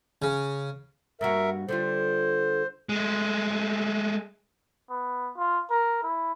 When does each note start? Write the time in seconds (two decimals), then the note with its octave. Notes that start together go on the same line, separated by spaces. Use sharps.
0.22 C#3
1.21 G2 A#3 F#4 A#4 E5
1.69 D3 G3 F4 C5
2.89 G#3 A3
4.90 B3
5.37 F4
5.70 A#4
6.03 E4